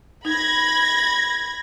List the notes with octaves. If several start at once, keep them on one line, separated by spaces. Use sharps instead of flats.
D#4 B5 G#6 A#6